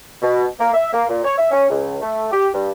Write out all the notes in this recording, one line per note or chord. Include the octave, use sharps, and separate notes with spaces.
B2
A#3
E5
A#3
A#2
C#5
E5
C#4
C#2
A3
G4
G2